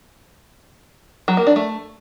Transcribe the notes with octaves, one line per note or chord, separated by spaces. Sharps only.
F#3
A#3
D4
A3